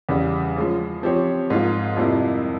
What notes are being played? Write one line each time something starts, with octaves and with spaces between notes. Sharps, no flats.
E2 C#3 G3
F3 G#3 C#4
F3 C4 G4 C#5
G#2 F3 A#3 F4
F2 C3 G3 A#3 E4